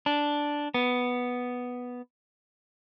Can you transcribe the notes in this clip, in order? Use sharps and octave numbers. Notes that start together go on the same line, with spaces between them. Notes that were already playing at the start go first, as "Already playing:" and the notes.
D4
B3